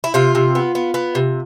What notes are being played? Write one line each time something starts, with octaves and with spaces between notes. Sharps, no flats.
E4
C3 F4
C3
B3
B3
B3
C3